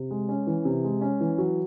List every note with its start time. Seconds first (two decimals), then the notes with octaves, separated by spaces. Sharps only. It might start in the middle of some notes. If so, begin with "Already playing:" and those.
Already playing: C3
0.11 G#3
0.29 C#4
0.47 E3
0.65 C3
0.84 G#3
1.01 C#4
1.21 E3
1.38 F#3